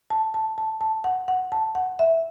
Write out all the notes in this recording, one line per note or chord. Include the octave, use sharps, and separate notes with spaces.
A5
A5
A5
A5
F#5
F#5
A5
F#5
E5